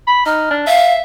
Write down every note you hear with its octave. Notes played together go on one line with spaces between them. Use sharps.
B5
D#4 F6
D4
E5 F5